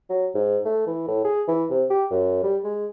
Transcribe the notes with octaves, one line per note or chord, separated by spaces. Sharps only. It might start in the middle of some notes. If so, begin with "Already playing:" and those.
F#3
G#2
A3
E3
A2
G#4
E3
C3
G4
F#2
G3
G#3